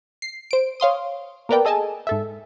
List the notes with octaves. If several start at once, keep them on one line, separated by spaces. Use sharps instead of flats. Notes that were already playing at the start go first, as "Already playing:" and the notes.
C7
C5 D7
C#5 F5 C6 D#6
A#3 B3 A#4 B4 D5 G5
G#4 A4 D#5 G#5 A5
G#2 A4 E5